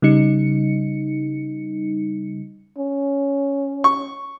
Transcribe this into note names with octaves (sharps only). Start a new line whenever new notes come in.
C#3 G3 D#4 C#7
C#4
C#6